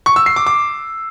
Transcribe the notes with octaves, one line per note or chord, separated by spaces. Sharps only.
C#6
E6
C7
D6
D6